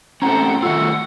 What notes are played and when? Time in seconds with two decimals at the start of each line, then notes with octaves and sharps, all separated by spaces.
0.22 A2 C4 C#4 A4 F#5 G5 A#5
0.63 D#3 A3 F4 F#4 F#5 E6